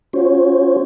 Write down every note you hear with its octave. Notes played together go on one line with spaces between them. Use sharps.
C#4 F4 F#4 C5 C#5